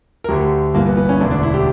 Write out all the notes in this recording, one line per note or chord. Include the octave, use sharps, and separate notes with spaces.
A#4
D2 D3 G4
G1 G2 E3 A#3
B3
B3
C#4
E1 D2 D3 D4
D4
E4
G4